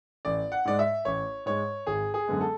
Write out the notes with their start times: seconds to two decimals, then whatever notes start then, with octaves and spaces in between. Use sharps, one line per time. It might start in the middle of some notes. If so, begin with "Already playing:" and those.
0.25 A1 D5
0.52 F#5
0.65 G#2 G#3 D5
0.79 E5
1.05 A1 C#5
1.46 G#2 G#3 C#5
1.87 G#1 G#4
2.14 G#4
2.28 F#2 D3 G#3 B3
2.41 A4